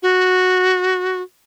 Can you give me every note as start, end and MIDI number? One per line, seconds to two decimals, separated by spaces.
0.03 1.21 66